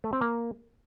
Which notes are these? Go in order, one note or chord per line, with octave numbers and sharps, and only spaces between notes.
A3
C4
A#3